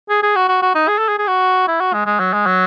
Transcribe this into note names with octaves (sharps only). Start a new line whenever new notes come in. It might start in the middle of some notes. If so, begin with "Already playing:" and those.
G#4
G#4
F#4
F#4
F#4
D#4
G#4
A4
G#4
G#4
F#4
E4
F#4
G#3
G#3
F#3
G#3
F#3